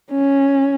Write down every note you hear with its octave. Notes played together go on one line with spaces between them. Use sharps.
C#4